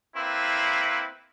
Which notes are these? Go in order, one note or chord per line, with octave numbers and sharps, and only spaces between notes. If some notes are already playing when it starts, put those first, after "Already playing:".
A#3 C4 E4 B4